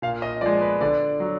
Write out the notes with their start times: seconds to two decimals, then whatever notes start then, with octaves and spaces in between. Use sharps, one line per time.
0.02 A#2 F5
0.22 D#5
0.41 F3 G#3 D5
0.61 B4
0.81 D3 D5
1.20 F#3